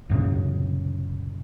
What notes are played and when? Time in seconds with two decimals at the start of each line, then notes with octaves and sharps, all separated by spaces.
0.09 C2 F#2 A#2 C#3